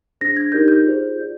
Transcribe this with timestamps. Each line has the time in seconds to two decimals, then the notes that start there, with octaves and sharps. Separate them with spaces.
0.21 D4 G#4 C5 A#6
0.37 G#6
0.52 D#4 G4 A#4 D5 G6
0.68 G6
0.85 F4 G#4 C5
1.16 F4 G#4 D5